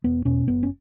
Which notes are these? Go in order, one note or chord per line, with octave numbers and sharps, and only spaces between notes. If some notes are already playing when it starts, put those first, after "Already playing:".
E1 B3
E2 B2 C#4
F#1 B3
C#4